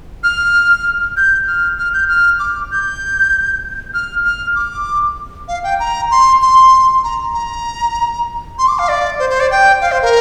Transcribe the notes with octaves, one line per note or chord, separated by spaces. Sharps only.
F6
G6
F6
F6
G6
F6
D6
G6
F6
F6
D6
F5
G5
A#5
C6
C6
A#5
A#5
C6
D6
F5
D5
C5
C5
D5
G5
F5
C5
A#4